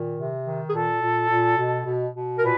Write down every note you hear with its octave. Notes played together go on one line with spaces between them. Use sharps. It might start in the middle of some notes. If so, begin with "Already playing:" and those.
Already playing: A#2 D#3
C3
D#3
G#4
A#2 A4
A#2
A#2
B2
B2
B2
A#4
A#2 B4